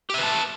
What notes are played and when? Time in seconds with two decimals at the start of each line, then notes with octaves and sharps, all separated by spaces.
0.10 G4
0.14 E5
0.18 B4
0.23 A5